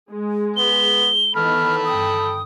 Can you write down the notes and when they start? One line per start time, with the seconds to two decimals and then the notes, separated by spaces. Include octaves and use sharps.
0.10 G#3
0.57 B3 G7
1.35 D#3 E3 B3 A4 B5 F6
1.85 G1 G5 D#6